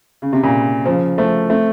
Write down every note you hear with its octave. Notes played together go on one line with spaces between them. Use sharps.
C#3
C3
A#2 C#3
C#3 F3
F3 A3
A3 C4